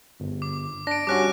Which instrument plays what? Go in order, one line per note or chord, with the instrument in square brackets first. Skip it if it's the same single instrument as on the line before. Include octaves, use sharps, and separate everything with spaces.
[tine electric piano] G1
[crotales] D6
[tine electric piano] D4 [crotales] A#6 D7
[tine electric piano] G3 C#4 F#4 [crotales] D6 F#6 A#6